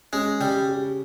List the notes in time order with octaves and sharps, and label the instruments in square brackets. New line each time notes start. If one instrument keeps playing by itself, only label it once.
[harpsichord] G#3 [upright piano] C#4
[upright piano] C#3 [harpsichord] G3
[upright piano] G4